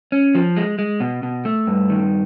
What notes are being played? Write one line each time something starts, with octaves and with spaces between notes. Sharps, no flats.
C#4
F3
G#3
G#3
B2
B2
A3
G2
D#3